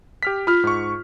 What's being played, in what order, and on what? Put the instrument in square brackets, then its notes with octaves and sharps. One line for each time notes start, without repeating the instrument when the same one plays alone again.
[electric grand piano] G4 F6 B6
[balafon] F4 [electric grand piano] B5 F6
[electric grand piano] G#2 C#6